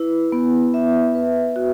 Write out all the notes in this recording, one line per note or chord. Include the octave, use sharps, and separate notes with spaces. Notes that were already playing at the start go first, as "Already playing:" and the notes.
Already playing: E4 B4
B3
E5
B4
F#4